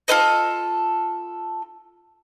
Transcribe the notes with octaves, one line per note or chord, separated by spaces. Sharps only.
F4 A4 B4 D#5